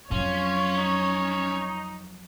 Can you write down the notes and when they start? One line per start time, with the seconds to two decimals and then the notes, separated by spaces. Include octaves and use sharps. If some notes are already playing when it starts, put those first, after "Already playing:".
0.11 F2 F#3 C#4 F4 C#5
0.77 D#4